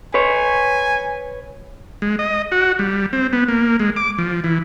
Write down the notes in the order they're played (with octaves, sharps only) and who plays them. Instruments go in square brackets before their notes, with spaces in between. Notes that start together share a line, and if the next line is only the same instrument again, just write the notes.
[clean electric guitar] B4 C#5 [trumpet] G#5
[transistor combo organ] G#3
D#5
F#4
G3
C4
B3
A#3
G#3
D6
F3
E3